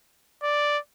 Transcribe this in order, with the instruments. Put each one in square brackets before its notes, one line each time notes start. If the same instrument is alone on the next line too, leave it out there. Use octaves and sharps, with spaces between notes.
[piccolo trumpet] D5